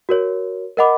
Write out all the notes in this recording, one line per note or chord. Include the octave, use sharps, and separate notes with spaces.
F#4 A#4 C#5
A#4 D#5 F#5 B5 D6